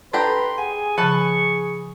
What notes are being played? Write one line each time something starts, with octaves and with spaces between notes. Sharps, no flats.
D4 G4 A4 B4 A#5 C6
G#4 F#5 G#5
C#3 F3 B4 A5 C#6